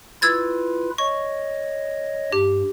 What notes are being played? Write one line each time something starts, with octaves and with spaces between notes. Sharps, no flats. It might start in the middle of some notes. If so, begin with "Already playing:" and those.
E4 F4 B4 E6 G#6 A6
C#5 D#5 C#6
G2 G4